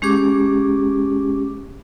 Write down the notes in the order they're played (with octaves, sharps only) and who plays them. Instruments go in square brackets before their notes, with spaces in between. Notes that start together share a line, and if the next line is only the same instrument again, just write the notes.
[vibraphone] G#3 C#4 G4 G#4 D6